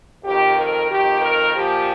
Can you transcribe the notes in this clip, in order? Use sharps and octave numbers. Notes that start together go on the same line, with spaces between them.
F2 D#3 G4
A#4
F2 D#3 G4
A#4
A#2 F3 G4